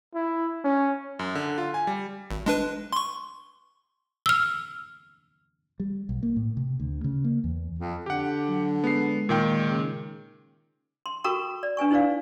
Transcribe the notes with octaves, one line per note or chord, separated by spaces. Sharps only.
E4
C#4
F#2
D3
F4
G#5
G3
G#1
G#3 D4 B4
C6 C#6
E6 F6
G3
B1
A#3
A2
C3
D2
C#3
A#3
E2
F2
D3 G4 F#5
F#3
G#3 B3 C7
A#2 D#3 G5
C#3
C6
F#4 A4 A#4 G5 A#5 C#6
D5
D4 B4 G#5 C#6
D#4 E4 B4 D5 F5